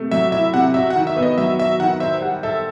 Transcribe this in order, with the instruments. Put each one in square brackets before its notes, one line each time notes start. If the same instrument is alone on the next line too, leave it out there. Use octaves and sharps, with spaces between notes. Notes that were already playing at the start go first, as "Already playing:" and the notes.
Already playing: [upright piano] C3 A3
[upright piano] F#3 [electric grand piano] E5
[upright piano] E4 [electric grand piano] E5
[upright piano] C3 [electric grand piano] F#5
[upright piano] F#4 [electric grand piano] E5
[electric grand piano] F#5
[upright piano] D#3
[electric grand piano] E5
[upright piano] B3
[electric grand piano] D#5
[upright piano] F#3 [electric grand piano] E5
[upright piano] F#4 [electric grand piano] E5
[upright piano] D#3 [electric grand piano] F#5
[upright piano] C5 [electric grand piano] E5
[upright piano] G3 [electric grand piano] F#5
[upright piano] A4 [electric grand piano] E5